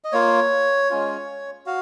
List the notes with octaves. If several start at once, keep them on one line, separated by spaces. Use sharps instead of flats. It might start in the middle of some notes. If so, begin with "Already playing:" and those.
D#5
A#3 F4 C#5
G#3 C#4 F4
F#4 F5